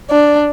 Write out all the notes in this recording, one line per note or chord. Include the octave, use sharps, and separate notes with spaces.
D4